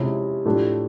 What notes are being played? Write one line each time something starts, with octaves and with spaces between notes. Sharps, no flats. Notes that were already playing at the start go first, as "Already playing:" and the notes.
Already playing: C3 F3 G#3 C#4 E4
A2 F3 A3 D4 G4